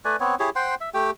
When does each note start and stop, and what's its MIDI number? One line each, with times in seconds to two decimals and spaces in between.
0.05 0.16 57
0.05 0.16 71
0.05 0.16 74
0.05 0.16 80
0.20 0.35 59
0.20 0.35 60
0.20 0.35 73
0.40 0.50 64
0.40 0.50 67
0.40 0.50 68
0.40 0.50 73
0.56 0.75 72
0.56 0.75 78
0.56 0.75 79
0.56 0.75 84
0.81 0.90 76
0.94 1.11 57
0.94 1.11 67
0.94 1.11 79